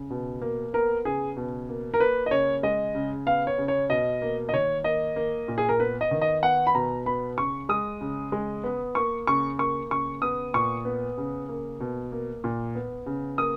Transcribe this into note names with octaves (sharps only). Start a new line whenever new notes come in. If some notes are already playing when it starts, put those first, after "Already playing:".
Already playing: C#3
B2
A#3
B3 A#4
C#3 G#4
B2
A#3
A#4
A#3 B4
D#5
C#3 C#5
G#3 D#5
C#3
B3 F5
C#5
C#3
C#5
B2 D#5
A#3
D#5
D#3 C#5
A#3 D#5
A#3
A#2
G#4
A#4
B3 B4
D#5
D#3
D#5
B3 F#5
B5
B2 A#5
B3 B5
C#3 C#6
G#3 D#6
C#3
G#3
B3
A#3 C#6
C#3 C#6
A#3 C#6
C#3 C#6
B3 D#6
A#2 C#6
B3
C#3
A#3
B2
A#3
A#2
B3
C#3
A#3 D#6